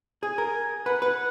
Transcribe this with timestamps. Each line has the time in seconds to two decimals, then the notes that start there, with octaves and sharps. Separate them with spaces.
0.23 G#4 G#5
0.38 A#4
0.86 B4 F#5
1.02 B4